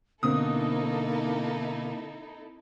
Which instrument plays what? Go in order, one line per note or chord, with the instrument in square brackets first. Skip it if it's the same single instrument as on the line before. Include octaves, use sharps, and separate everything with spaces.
[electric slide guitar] B2 D3 [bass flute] A#3 [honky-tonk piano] C4 D#6 [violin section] D#4 E4 A4